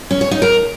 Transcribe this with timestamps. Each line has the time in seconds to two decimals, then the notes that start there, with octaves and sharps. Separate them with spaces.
0.11 C#4
0.21 C#5
0.31 D#4
0.42 A#4